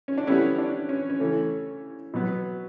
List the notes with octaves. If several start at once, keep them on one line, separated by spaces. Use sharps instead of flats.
C#4
D4
D3 G3 B3 C#4 E4
D4
C#4
C#4
C#3 E3 A3
B2 F#3 B3